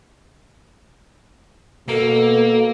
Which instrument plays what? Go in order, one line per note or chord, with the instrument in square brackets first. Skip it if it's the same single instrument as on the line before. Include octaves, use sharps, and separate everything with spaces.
[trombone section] B2 [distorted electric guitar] A#3 [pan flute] A4